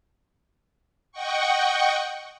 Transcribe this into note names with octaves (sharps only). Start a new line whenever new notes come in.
D#5 F#5 G5 C#6